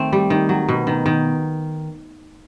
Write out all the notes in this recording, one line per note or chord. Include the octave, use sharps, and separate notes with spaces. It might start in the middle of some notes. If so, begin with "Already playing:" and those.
Already playing: D#3 A3 C4
G3
D#3
F#3
B2
D#3
D#3